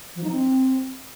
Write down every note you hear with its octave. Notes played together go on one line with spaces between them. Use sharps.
F3
D#4
C4